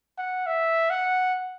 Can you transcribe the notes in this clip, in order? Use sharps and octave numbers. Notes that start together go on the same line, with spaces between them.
F#5
E5
F#5